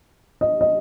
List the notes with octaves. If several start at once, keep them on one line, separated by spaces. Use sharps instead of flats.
D#5
D#5